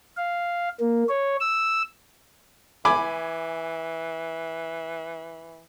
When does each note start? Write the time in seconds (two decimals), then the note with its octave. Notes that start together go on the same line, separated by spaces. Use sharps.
0.17 F5
0.80 A#3
1.09 C#5
1.41 E6
2.85 E3 G#5 B5 D6